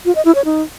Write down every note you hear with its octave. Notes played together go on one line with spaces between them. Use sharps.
F4
D#5
E4
C#5
D#4